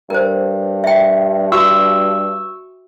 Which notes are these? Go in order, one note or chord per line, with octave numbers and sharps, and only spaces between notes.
G2 A#4 C5
E5 G5
F#4 C#6 D6 E6